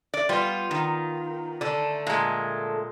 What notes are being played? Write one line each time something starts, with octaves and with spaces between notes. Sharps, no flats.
D5
G3 B3 F4
D#3
D3 A3 A4
A#2 G#3